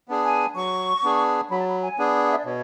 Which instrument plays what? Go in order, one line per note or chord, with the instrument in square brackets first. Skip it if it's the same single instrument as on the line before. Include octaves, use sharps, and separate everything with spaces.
[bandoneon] B3 D4 G#4
[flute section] G#5
[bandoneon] F#3 [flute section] C#6
[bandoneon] B3 D4 G#4
[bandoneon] F#3 [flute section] B5
[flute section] A5
B5
G#5
[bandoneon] B3 D4 G#4
[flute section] F#5
E5
D5
[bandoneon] B2 [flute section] C#5